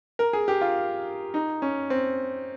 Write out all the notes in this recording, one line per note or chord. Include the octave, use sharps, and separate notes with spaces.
A#4
G#4
G4
F4
D#4
C#4
C4